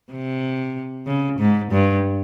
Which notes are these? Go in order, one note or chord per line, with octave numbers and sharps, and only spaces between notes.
C3
C#3
G#2
G2